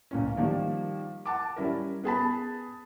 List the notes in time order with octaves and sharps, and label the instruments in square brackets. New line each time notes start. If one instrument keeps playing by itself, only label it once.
[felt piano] C#2 A#2 C#4
D#3 F3 G3 A#3
F#5 A5 D6
G3 C#4 E4 A#4
B3 G#4 A5 B5